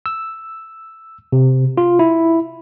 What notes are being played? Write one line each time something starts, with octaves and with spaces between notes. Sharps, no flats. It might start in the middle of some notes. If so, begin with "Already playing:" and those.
E6
C3
F4
E4